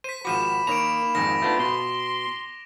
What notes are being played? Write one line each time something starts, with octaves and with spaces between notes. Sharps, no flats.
C5 B6 D#7
G#1 F3 F#4 B5 D6 D#7 E7
D#3 A#3 C#5 A#5 D7 F7
F2 G#2 D#3 A#6
A3 B3 D4 F4
B2 C6